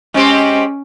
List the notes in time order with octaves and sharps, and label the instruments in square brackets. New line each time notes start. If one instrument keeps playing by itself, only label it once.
[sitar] G#3 C4 G4 [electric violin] C#4